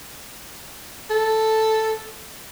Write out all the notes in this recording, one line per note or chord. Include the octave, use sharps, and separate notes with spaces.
A4